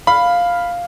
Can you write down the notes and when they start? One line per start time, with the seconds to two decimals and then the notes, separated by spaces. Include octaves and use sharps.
0.07 F5 B5